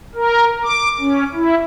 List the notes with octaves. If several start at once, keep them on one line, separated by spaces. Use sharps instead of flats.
A#4
D6
C#4
E4